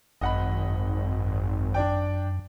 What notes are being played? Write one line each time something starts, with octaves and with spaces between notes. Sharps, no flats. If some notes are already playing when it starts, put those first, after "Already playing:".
G#1 F#2 D#5 F#5 B5
D4 D5 G5